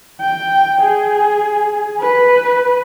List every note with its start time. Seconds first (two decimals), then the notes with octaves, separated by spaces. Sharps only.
0.21 G5
0.81 G#4
2.01 B4